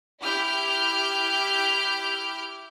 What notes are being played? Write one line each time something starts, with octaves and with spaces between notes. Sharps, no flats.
E4 G4 F6 G6